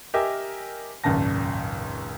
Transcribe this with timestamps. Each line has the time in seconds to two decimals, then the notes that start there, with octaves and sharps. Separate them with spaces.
0.14 G4 A#4 D#5 E5 G#5
1.04 G#1 C#2 F#2 A#2 A5 A#6